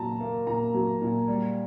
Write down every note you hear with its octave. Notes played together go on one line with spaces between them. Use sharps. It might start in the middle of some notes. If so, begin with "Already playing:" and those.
Already playing: A#2 F#3 A5 A#5
A#3
A#2 A#5
F#3
A#2
G3